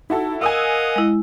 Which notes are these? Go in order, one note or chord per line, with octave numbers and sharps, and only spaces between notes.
D#4 E4 F#4 A4
A#4 D#5 F5 F#5 G#5 D#6 E6
G#3 E4